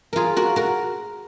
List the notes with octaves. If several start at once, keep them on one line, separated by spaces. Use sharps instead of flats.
F4 G#4 A#4
F#4 A#4
F#4 A#4